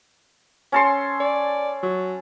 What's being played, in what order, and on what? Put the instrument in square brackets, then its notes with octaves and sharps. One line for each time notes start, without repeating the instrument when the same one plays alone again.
[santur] C#4 A4 C6
[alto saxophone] D5
F#3